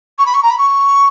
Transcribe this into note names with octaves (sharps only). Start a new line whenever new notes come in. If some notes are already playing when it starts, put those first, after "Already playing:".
C#6
B5
C#6
A#5
B5
C#6